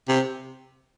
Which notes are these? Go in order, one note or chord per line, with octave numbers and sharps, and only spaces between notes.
C3